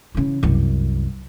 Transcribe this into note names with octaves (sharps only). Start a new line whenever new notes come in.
C#3 E3
C2 F#2